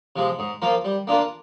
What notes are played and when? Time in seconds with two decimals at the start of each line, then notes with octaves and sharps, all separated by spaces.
0.16 C3 F3 G#3
0.39 G#2
0.62 F3 A#3 F4 A#4
0.85 G3
1.07 A#3 D4 F4 A#4